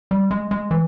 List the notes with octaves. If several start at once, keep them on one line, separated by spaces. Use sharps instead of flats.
G3
G#3
G#3
E3